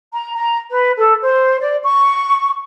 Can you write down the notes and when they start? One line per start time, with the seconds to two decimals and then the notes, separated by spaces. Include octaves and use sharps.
0.13 A#5
0.35 A#5
0.70 B4
0.98 A4
1.21 C5
1.60 D5
1.83 C#6